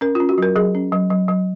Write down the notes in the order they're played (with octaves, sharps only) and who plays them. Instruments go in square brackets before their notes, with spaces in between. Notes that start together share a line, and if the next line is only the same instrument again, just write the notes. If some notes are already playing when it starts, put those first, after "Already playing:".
[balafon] C#4 A#4
F4
C#4
F#4
F#3 A#4
F#3 G#4
C#4
F#3
F#3
F#3